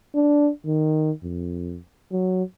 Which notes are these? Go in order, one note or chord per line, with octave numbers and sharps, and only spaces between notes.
D4
D#3
F2
F#3